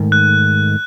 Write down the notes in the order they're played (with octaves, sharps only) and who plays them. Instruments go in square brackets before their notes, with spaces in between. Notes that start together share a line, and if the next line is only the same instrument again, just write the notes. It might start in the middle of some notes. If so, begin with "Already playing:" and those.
Already playing: [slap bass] G#2 D#3 A3
[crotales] F#6